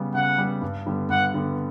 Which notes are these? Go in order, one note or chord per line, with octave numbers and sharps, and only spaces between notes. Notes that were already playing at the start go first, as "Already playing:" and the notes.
Already playing: C#3 G3 B3
C#3 F#5
G3 B3
G2
D3 G3 B3
G2 F#5
D3 G3 B3